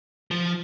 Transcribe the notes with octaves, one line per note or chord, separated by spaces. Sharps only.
F3